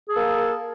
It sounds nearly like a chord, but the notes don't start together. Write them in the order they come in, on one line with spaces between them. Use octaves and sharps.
G#4 A4 A#3